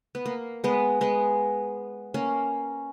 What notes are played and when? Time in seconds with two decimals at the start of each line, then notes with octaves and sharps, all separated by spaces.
0.15 B3
0.26 A#3
0.64 G#3 B3
1.01 G#3 B3
2.14 A#3 C#4